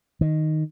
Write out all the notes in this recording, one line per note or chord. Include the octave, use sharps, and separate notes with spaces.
D#3